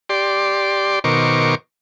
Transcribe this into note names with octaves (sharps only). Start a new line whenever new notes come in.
G4 D5 C6
B2 D#3 A#4 C5 C#6 D6